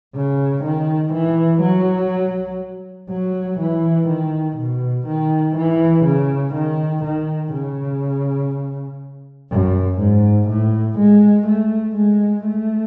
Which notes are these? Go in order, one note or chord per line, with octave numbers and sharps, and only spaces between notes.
C#3
D#3
E3
F#3
F#3
E3
D#3
B2
D#3
E3
C#3
D#3
D#3
C#3
F#2
G#2
A2
G#3
A3
G#3
A3